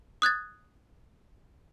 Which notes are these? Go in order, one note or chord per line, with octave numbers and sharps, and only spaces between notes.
D#6 F#6 G#6 A6